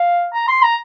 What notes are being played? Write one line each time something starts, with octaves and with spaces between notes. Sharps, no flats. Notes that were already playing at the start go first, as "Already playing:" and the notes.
Already playing: F5
A#5
C6
A#5